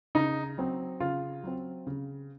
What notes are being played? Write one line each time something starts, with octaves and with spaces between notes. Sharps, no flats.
C#3 D#4
F#3 C4
C#3 F4
F#3 C4
C#3